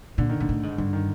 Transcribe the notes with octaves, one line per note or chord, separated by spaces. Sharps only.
A#2 D3
D#3
A#2 D3
A2
G#2
G2 D3
D#3